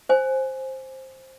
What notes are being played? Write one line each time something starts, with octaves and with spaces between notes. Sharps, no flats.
C5 G#5